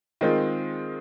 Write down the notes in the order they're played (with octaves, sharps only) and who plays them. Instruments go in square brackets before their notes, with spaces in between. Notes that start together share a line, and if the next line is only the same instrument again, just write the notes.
[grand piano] D#3 G#3 C4 F4